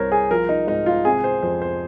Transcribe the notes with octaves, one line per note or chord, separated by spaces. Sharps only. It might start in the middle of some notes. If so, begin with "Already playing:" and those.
Already playing: C2 G2 A#4 C5 C#5
G#4
F3 A#4
D#4
G#2 D#4
F4
C3 G#4
C5
F2 C5
C5